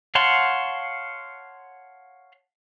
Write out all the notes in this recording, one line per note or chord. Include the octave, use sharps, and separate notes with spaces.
C#5 F5 F#5 A5 C6